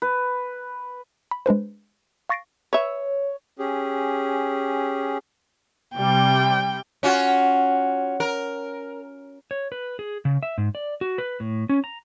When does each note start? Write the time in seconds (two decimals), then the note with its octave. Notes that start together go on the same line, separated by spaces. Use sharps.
0.02 B4
1.31 B5
1.46 G#3 D4 B4 C5
2.29 F5 C#6 A6 A#6 C7 D7
2.73 B4 C#5 E5
3.59 C#4 G4 G#4
5.95 C3 G3 G5
7.03 C#4 F4 F#4
8.20 A#4
9.51 C#5
9.72 B4
9.99 G#4
10.25 C#3
10.43 E5
10.58 G#2
10.75 D5
11.01 F#4
11.18 B4
11.40 A2
11.69 C#4
11.84 A#5